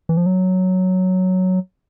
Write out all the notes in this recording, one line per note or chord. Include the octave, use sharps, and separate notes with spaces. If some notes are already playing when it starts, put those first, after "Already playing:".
E3
F3
F#3